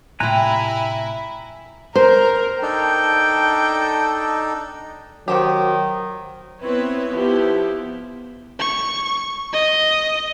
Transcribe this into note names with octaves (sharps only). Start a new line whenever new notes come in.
A2 C3 E4 F4 G4 G#5 A#5 F#6
A#4 C5
D4 D#4 A4 G5
D#3 F#3 G4 C5 F#5
B3 C4 E4 B4 C#5
F3 B3 E4 G4
C#6
D#5